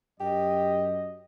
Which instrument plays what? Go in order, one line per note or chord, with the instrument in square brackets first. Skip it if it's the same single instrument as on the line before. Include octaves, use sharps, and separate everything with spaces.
[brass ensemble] F#2 D#5 [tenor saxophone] G4